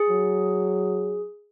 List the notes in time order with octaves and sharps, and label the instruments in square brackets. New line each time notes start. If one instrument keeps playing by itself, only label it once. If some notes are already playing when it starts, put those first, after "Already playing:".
Already playing: [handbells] G#4
[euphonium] F#3